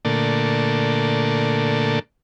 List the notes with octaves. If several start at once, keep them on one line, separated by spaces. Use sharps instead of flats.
A#2 D3 A3